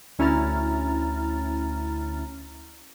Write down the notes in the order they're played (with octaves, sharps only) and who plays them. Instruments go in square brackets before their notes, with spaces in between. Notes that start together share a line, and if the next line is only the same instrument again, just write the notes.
[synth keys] D2 C#4 E4 A#5 F6 A6